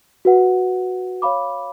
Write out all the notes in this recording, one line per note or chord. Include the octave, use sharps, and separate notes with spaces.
F#4 B4 F#5
C#5 F5 B5 D6